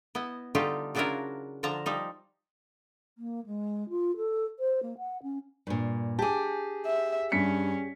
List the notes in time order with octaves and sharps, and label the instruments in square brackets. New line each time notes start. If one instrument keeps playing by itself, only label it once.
[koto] B3 E4 D#5
D3 G3 A3 D#4 F4 G4
C#3 F#3 D4 E4 F4 A#4
D3 F3 A5 A#5
F3 G3 D#4
[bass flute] A#3
G#3
F4
A4
C5
A#3
F#5
C#4
[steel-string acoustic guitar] G2 A#2
[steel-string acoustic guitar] G4 G#4 [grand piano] A5 D6
[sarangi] E5
[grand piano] G2 B6 C#7 [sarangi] C#4